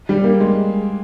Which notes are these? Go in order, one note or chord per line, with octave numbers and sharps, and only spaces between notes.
G3
A#3
G#3